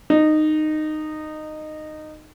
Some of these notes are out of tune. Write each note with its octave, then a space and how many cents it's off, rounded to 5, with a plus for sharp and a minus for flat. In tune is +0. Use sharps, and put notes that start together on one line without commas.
D#4 -15